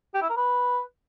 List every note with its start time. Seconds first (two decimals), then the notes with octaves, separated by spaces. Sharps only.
0.14 G4
0.22 E4
0.29 A#4
0.37 B4